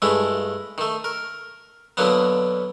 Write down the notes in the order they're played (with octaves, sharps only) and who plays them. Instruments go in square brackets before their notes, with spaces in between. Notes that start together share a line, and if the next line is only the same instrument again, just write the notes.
[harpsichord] G2 G#3 A3 E4
D#3 A3
A#4
B2 D3 F#3 A#3 B3